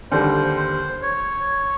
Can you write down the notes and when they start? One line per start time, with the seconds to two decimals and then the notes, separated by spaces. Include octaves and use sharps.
0.11 D#2 D3 G3 C5
0.57 C5
1.02 C#5